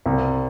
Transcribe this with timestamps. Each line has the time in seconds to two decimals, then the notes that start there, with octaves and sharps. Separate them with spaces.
0.06 C2